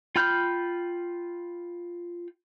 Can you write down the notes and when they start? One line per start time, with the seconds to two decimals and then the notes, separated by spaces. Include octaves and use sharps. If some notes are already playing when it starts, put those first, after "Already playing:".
0.16 F4 G5 B5 F6 G6